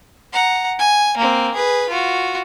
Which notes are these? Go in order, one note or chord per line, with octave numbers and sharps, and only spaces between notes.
F#5 A#5
G#5
A#3 C4
G#4 B4
F4 F#4